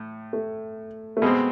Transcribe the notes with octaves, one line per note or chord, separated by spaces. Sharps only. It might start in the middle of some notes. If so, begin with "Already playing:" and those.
Already playing: A2
A3
A3
B2 G#3 B3 C4